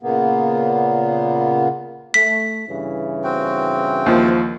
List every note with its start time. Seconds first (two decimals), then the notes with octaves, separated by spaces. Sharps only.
0.02 A#2 C#3 A#3 B3
2.14 A3 B6
2.68 G2 C#3 E3
3.24 C4 F#4 G5
4.06 D#2 F3